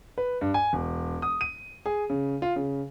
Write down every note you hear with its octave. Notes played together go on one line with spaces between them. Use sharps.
B4
G2
G#5
E1
D#6
D#7
G#4
C#3
F4
C#3